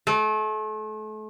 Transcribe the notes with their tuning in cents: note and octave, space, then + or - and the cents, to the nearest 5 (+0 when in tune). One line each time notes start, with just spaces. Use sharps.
A3 -35